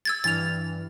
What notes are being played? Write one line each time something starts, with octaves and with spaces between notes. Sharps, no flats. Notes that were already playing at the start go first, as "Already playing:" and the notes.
E6 G#6 A6
G2 E3 F6 A6 F7